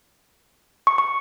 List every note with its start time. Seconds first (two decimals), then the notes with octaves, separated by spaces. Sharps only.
0.87 C#6
0.98 C#6